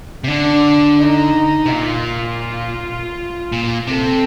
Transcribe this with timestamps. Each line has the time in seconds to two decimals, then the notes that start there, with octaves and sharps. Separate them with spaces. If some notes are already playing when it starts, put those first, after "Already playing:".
0.24 C3
0.28 D3 D4
1.00 D#4
1.66 C3
1.72 A#2 F4
3.52 A#2
3.87 C3 A4